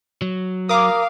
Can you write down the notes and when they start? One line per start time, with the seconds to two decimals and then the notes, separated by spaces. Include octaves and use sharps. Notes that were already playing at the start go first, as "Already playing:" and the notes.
0.22 F#3
0.69 A#4 F5 D6 D#6